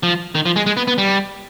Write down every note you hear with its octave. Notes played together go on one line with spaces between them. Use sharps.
F3
D#3
F3
G#3
G#3
B3
B3
G3